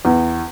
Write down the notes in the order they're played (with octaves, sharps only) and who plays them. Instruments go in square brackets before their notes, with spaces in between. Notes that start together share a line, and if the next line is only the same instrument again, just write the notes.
[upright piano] E2